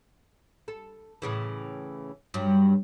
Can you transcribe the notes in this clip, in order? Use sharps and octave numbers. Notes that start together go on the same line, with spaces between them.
A4
A2 C#3 E3
G2 F#3